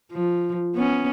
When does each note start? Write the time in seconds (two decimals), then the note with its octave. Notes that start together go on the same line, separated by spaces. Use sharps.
0.12 F3
0.75 B3 C#4